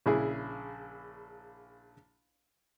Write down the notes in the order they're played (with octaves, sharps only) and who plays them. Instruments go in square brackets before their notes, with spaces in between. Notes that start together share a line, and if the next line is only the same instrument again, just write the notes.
[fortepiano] A#1 C#3 E4 G#4